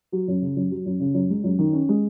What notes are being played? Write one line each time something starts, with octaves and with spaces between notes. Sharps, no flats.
F#3
F#2
C#3
F#2
F#3
F#2
C#3
F#2
G#3
F#2
D#3
C#4
G#3